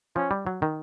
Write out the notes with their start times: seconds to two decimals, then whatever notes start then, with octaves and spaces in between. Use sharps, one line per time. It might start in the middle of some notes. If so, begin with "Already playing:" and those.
0.15 F3 C#4
0.31 G3
0.47 F#3
0.62 D#3